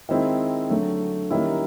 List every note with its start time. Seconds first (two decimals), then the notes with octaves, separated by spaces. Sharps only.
0.09 D#3 G#3 C4 E4
0.70 D3 F#3 A3
1.30 D#3 G3 A#3 C#4 E4